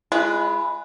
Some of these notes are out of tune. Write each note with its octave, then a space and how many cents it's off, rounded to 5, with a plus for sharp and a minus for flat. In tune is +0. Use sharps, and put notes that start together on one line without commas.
G#3 +0 F4 -45 B4 +0